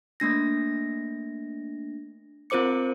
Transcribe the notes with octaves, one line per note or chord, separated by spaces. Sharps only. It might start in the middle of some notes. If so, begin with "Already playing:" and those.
A3 A#3 D4 A#6
C4 F4 A#4 C5 D6 C#7